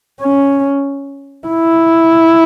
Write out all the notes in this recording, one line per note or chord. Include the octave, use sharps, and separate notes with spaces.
C#4
E4